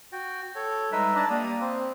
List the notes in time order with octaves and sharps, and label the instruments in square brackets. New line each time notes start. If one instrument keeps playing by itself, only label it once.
[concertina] F#4 G5
A4 C#5
[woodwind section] G3 G#3 [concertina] D#4 B4 E5
[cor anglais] D4 [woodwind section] A5 A#5
[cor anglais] G3 [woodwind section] A#3 [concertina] D#6
[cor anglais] C4